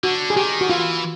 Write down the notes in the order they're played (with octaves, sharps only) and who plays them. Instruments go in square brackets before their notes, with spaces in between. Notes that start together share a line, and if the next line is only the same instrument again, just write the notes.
[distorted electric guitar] D3 [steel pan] F#4
[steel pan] G#4
[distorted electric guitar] D#3 [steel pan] G4
[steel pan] F#4
[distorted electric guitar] E3 [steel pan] F4